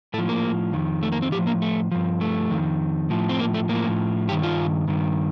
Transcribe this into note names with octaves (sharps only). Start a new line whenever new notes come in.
A2 F3 A3
A#3
F2 D#3
A3
A#3
C4
A2 F3 G4
A#3
A3
G2 F3
A3
F2 D#3
A2 F3
C4
A#3
A3
A2 F3 A#3
G2 D#3 G4
F4
G2 D#3